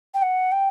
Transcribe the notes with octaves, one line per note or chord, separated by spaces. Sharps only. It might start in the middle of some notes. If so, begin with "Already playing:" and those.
G5
F#5
G5